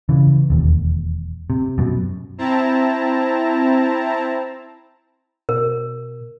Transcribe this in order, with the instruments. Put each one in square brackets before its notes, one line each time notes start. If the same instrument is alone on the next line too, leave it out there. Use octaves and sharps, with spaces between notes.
[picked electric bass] C#3 E3
E1 D#2
C3
F#2 B2
[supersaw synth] C4 E4 A5 A#5
[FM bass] B2 [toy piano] A#4